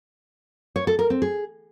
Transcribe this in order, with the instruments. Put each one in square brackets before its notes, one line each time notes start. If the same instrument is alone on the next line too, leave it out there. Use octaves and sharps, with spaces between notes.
[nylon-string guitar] C#5
A4
A#4
C4
G#4